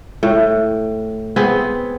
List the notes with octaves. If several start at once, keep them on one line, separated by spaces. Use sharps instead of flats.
A2
B3 C4 G#4